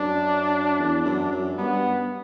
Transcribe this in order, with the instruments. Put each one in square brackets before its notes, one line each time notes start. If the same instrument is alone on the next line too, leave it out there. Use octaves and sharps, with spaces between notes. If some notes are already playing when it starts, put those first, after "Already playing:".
Already playing: [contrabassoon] F#2 [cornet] D4
[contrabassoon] E2
F#2
F#2
[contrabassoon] G2 [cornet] B3